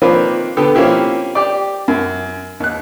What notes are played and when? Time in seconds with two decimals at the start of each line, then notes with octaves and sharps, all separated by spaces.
0.02 D#3 F3 A#3 C4 D4 B4
0.57 D3 B3 G4 A4
0.75 F3 A#3 C4 C#4 E4 G4
1.35 G4 D5
1.88 F#2
2.60 D#2 F#6